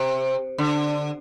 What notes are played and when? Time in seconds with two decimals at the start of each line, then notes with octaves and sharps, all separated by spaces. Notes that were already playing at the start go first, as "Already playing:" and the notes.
Already playing: C3
0.58 D3